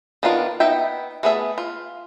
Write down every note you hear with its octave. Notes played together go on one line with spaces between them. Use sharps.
D#3 B3 D4 F4 A#4
B3 D#4 E5 G5
A3 B3 G#4 C#5 E5
F4